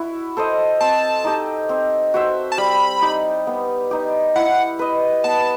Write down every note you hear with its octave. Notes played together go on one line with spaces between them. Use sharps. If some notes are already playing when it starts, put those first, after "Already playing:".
Already playing: E4 F#4
A4 C5 D#5
C4 A5
D#4 G4 D#5
C4
F#4 C5 E5
A5
G3 B5
D#4 G4
B3
D#4 G4
E4 F#5
B4 D#5
B3 A5